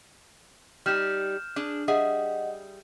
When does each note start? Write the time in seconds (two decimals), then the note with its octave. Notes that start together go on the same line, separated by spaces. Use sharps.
0.86 G3 D#4 G4 F6 G6 E7
1.56 D4 G#4
1.88 G3 G#4 D#5 E5 F#5